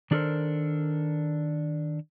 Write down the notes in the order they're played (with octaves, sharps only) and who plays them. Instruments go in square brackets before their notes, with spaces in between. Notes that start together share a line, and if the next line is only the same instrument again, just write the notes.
[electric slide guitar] D#3 D4 G4 A4 A#4 C5